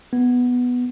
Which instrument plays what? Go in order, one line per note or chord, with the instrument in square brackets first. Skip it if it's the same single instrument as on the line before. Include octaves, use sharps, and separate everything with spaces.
[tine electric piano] B3